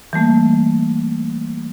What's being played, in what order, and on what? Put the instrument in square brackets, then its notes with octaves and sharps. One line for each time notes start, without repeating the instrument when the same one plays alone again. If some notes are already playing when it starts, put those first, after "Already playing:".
[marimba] E3 G3 A3 A#3